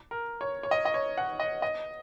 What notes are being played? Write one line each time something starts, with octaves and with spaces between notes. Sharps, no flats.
A#4
C#5
C#5
D#5
D#5
C#5
F#5
D#5
D#5